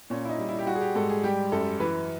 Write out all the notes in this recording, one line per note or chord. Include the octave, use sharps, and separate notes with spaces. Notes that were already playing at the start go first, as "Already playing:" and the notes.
A#2 C#4
E4
D#4
G3
E4
G4
G3 F#4
G#4
G4
G#2 A4
G#4
G3 G4
F#2 A4
E3 B4